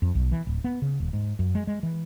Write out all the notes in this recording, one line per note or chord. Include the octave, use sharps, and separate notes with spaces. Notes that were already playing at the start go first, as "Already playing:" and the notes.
F2
B1
E3
D1
B3
C#3
D#1
G#2
F#2
G#3
G#3
E3